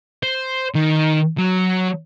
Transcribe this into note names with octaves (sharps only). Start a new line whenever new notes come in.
C5
D#3
F#3